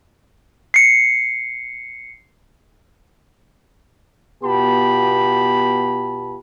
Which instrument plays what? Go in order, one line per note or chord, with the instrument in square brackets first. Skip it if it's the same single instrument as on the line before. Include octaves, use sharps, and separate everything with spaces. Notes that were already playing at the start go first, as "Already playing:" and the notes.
[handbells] C7 C#7
[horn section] B2 B3 F4 G4 A5 B5